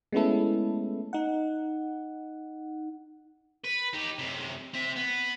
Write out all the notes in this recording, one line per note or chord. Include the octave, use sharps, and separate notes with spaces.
G#3 A3 B3 C#4 E4 A4
D#4 F#5
B4
D#4 G4
F#2 C3
C4 E5
B3